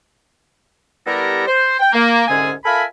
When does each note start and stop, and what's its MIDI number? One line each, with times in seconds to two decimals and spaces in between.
1.07 1.46 55
1.07 1.46 59
1.07 1.46 64
1.07 1.46 67
1.07 1.46 69
1.07 1.46 70
1.47 1.78 72
1.80 1.89 79
1.93 2.23 58
2.28 2.52 36
2.28 2.52 44
2.28 2.52 50
2.28 2.52 61
2.28 2.52 68
2.28 2.52 80
2.65 2.84 65
2.65 2.84 69
2.65 2.84 70
2.65 2.84 76
2.65 2.84 80
2.65 2.84 83